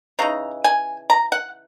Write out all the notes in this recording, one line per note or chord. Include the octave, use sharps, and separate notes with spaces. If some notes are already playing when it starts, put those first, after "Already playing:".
C#3 E3 D#4 A#5
G#5
A#5
F#5